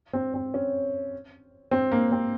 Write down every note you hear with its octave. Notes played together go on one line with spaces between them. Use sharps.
C4
C4
C#4
C4
A#3
C4